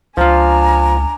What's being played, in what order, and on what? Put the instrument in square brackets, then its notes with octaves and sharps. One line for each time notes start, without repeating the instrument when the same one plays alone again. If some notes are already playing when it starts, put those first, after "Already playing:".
[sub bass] C#2 [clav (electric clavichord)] F3 F4 [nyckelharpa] D4 G#5 [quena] A#5